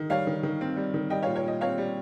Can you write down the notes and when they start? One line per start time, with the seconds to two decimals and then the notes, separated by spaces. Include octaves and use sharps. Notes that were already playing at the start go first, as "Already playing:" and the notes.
Already playing: D#3
0.10 G3 C#5 F5
0.27 D#3
0.43 D#3
0.61 C4
0.77 G3
0.94 D#3
1.10 G3 D#5 G5
1.23 A#2 C#5 F5
1.36 C#5
1.44 A#2 D#5
1.61 C4 C#5 F5
1.78 G3